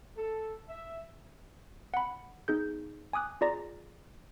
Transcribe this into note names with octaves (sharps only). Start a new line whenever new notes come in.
A4
E5
F#5 B5
B3 D#4 G#4 G6
G#5 D6 D#6 F#6
F4 G#4 D5 A#5 A#6